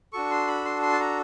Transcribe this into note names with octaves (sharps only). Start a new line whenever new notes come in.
D4 F#4 A4 C#6
C6
B5
C6
C6
A5
A#5